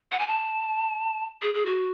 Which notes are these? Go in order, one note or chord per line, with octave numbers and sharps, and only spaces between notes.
F#5
G#5
A5
G#4
G#4
F#4